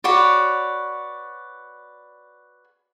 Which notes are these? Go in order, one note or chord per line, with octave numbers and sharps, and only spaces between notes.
F#4 B4 C#5 D5